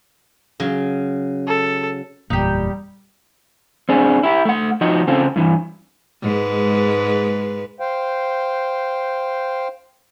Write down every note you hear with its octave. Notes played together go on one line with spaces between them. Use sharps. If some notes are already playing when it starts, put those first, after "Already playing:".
C#3 F#3
A4
F#1 E2 A#2 G3 D#4 G4
C4 D4 G#4
E4 G4
A3 F#5
F3 D#4 F#4 D#5
C#3 C4 F4 A4
G2 E3
G#2 G#3 B4
C5 F5 G5